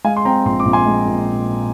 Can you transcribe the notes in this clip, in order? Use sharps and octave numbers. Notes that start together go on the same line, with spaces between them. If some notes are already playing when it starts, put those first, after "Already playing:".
G#3 F5 G#5
C6
C4 G5 A#5
A#1 C6
D6
A#1
G#5 C6
G#3
A#2